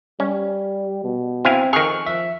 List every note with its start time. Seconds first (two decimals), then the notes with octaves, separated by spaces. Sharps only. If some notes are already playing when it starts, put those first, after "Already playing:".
0.20 G3 C#4
1.04 B2
1.45 C4 E4 F5 G#5
1.73 F2 D#3 G#4 C#6 F6 F#6
2.06 F3 E5